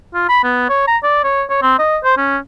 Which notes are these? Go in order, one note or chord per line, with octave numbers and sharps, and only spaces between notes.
F4
B5
B3
C#5
A#5
D5
C#5
C#5
C4
D#5
C5
C#4